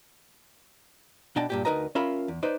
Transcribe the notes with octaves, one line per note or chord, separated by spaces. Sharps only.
B2 D4 D#5 G5 A5
G2 A#2 G4
D2 D#4 A#4 B4 D#5 A#5
C#4 F4 A#4 E5 F5 B5
E2
D#4 B4 C5 D5